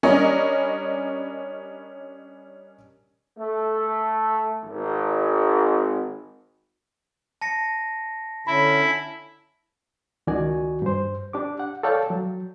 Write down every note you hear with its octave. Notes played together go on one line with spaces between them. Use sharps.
G3 C#4 D4 A#4 D#5
A3
G#1
A5 A#6 C#7
D3 C#4 E4 E5 B5
C#2 D#3 F#4 D5 G#5
G2 C5
D4 G4 D6
F#5
A4 C#5 D5 F5 G5 A5
F#3